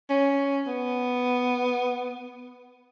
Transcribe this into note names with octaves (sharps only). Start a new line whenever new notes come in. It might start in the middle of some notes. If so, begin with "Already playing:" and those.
C#4
B3